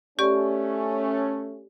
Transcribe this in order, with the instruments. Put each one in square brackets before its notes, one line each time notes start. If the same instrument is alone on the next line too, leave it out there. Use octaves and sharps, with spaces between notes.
[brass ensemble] A3 C#4 [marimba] G4 D5 C#6